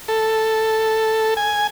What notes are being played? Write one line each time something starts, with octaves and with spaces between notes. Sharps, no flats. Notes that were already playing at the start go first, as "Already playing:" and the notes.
A4
G#5